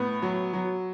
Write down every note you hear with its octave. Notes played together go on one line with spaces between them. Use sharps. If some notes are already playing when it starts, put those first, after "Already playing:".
Already playing: A2 B3
F#3
F#3